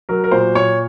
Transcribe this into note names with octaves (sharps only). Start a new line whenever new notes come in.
F#3 A#4
A#4
A#2 C5
A#2 C#5